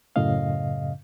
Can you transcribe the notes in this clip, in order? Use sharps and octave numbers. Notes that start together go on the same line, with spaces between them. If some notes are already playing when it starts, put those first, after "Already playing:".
F#2 A2 C#3 D#5 F5